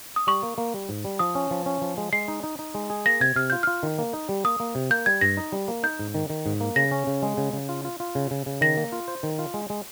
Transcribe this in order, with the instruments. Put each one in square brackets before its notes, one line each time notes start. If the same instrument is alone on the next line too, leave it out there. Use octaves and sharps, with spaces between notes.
[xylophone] D#6
[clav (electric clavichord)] G3 [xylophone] C#6
[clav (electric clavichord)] A#3
A#3
G3
G#2
G3
[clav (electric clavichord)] F3 [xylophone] D#6
[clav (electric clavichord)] C#4
F3
C#4
F3
G#3
[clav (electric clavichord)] G#3 [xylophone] C7
[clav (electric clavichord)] D#4
D#4
D#4
G#3
G#4
[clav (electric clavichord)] A#3 [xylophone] A#6
[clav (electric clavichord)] C3 [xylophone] G#6
[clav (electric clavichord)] C3 [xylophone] F6
[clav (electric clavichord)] F4 [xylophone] G6
[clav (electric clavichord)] F4 [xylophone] F6
[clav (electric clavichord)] D#3
A#3
D#4
G3
[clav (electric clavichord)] A#3 [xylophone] D#6
[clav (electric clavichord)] A#3
C3
[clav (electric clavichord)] A#3 [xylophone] G6
[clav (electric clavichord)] G3 [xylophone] G#6
[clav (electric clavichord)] G2 [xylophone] A#6
[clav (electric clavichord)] D#4
G3
A#3
[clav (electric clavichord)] D#4 [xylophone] G6
[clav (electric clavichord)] G#2
D#3
D#3
G#2
A#3
[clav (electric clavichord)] C#3 [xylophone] A#6
[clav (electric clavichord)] C#4
C#3
G#3
C#3
C#3
F4
F4
F4
C#3
C#3
C#3
[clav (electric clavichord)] D#3 [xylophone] A#6
[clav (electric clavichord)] A#3
F4
C5
D#3
F4
G#3
G#3